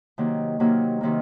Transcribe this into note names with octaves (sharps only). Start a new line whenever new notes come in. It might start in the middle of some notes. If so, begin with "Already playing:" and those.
C3 D#3 F#3 A#3
C3 D#3 F#3 A#3
C3 D#3 F#3 A#3